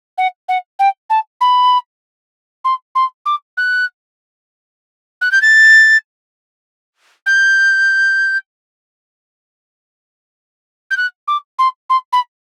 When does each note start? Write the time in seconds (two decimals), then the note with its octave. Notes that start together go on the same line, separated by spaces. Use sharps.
0.18 F#5
0.49 F#5
0.79 G5
1.10 A5
1.41 B5
2.65 C6
2.95 C6
3.26 D6
3.57 F#6
5.21 F#6
5.32 G6
5.42 A6
7.26 G6
10.91 G6
10.97 F#6
11.28 D6
11.59 C6
11.90 C6
12.13 B5